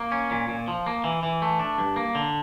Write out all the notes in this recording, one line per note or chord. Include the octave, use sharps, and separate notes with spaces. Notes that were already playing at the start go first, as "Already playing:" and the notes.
Already playing: A#3
C#4
A#2
A#2
F3
A#3
E3
E3
A3
D4
G2
A#3
D3